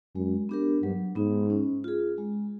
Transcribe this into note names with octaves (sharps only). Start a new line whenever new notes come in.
F#2 G#3
B3 D4 G4 A#4
G2 F#3
G#2 B3 D#4
C#4
F4 G#4
G#3